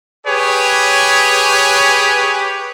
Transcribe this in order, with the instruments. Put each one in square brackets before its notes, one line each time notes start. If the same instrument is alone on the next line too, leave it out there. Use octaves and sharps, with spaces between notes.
[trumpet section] G4 G#4 B4 C#5